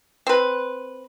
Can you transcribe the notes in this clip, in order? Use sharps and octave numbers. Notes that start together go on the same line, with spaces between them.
C4 B4